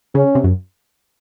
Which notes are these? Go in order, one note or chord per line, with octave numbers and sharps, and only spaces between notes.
C#3 C#4
C3
F#2